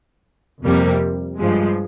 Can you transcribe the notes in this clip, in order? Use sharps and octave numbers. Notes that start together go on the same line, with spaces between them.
F2 C3 G3 A#3
G2 F3 G#3